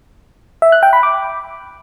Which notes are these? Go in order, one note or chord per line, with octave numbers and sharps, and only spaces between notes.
E5
F#6
G5
B5
D6